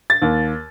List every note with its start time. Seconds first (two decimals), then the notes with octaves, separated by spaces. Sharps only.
0.10 A6
0.22 D#2